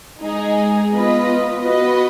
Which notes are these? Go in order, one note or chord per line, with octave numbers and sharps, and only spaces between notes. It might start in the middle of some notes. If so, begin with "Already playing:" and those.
G#3 D#4 G#4
B3 F4 B4 D#5
B3 F#4 B4 D#5